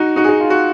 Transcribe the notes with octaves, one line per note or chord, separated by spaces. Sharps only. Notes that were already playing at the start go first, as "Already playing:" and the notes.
Already playing: D#4 F#4
D#4 F#4
G#4
D#4 F#4
F4
F#4